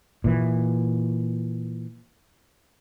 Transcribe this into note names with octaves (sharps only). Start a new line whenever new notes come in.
A#2 E3